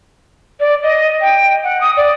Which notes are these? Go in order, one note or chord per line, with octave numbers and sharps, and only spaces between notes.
D5
D#5
G5
F#5
D#6
D5